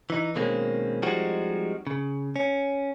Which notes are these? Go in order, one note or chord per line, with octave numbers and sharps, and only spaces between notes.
E3 D#4
B2 D#3 G#3 A#3 C4 C#4
F3 G3 G#3 C4 D#4 F#4
C#3
C#4